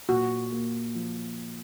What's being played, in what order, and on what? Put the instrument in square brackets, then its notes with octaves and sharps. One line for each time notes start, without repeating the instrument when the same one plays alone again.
[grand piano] A#2 [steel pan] F#4
[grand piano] A#3
F3